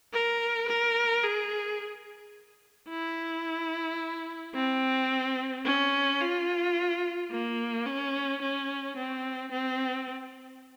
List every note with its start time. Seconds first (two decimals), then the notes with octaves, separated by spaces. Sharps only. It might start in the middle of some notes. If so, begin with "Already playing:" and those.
0.14 A#4
0.68 A#4
1.24 G#4
2.89 E4
4.55 C4
5.65 C#4
6.21 F4
7.31 A#3
7.86 C#4
8.42 C#4
8.96 C4
9.52 C4